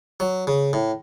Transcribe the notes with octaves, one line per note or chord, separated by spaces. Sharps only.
F#3
C#3
A2